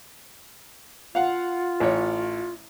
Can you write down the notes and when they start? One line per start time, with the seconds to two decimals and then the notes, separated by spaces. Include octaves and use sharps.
1.15 F4 F5 F#5
1.80 A1 C#5